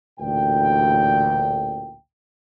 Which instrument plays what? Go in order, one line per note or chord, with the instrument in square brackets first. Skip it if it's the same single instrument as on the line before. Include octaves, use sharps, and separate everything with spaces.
[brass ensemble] A1 D2 A#2 G5